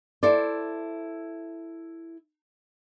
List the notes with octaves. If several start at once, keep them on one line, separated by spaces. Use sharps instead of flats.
E4 A4 C5 D5